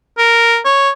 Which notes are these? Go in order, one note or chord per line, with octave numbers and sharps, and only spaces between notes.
A#4
C#5